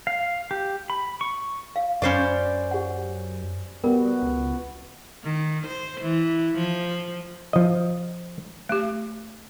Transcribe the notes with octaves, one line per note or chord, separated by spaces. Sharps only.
F5
G4
B5
C#6
F5
F#2 C#4 C5 D5 B5 C#6
G4 F#5
G3 B3 F#4 A#4
C#2
D#3
C5
E3
F3
F3 D#5
A3 G4